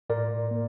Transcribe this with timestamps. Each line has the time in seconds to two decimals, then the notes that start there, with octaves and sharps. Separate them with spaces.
0.10 A2 A#4 D5
0.51 A#3